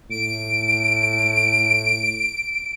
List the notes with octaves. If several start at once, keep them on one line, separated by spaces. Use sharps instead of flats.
A2 D7